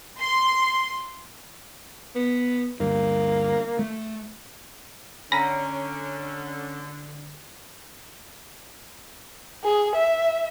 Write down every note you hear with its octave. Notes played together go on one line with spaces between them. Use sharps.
C6
B3
D2 G2 A#3
A3
D3 C#4 G#5 A#5 B5 A#6
G#4
E5